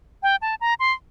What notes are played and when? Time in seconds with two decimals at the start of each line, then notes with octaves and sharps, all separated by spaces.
0.23 G5
0.42 A5
0.61 A#5
0.80 C6